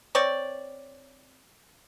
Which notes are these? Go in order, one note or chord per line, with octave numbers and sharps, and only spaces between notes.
C4 C#5 D5